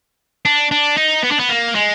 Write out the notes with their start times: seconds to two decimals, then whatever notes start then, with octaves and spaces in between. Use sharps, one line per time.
0.45 D4
0.71 D4
0.97 D#4
1.24 B3
1.32 D4
1.40 B3
1.50 A#3
1.75 G#3